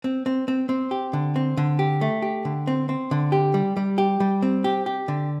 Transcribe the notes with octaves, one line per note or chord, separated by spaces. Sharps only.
C4
C4
C4
C4
G4
D3
C4
D3
G4
A3
G4
D3
C4
C4
D3
G4
G3
G3
G4
G3
C4
G4
G4
D3